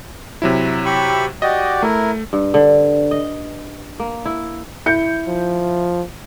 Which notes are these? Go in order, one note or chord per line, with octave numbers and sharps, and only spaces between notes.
C3 F#3 E4
G4 B5 C#6
F#4 G4 D5 D#5
A3 E4 A#4
G2
D3
D#5
A#3
E4
E4 G6 C#7
F3